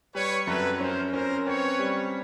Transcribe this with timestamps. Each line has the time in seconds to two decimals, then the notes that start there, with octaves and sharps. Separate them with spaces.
0.14 G3 B4 C#5
0.47 F#2 A4 B4
0.80 C#4 A#4 C5
1.13 C#4 A#4 C5
1.46 C4 B4 C#5
1.79 G3